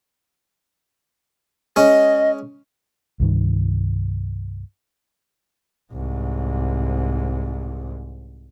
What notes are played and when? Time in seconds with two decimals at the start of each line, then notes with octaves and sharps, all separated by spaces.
1.76 G#3 C#4 D#5
3.20 C2 G2 D#3
5.93 C2 G#2